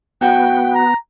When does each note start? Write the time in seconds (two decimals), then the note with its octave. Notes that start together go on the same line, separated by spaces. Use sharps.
0.21 A2 F#3 B3 F#4 G5
0.75 A#5